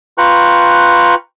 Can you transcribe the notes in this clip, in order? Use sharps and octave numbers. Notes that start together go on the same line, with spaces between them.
F4 B4 G5 A#5 C#6 F#6